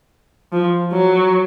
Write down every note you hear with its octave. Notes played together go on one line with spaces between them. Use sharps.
F3
F#3